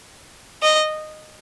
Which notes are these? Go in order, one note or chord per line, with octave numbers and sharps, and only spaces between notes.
D#5